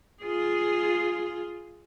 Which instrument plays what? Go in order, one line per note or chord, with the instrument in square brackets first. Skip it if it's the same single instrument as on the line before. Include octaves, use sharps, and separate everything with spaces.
[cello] F4 G#4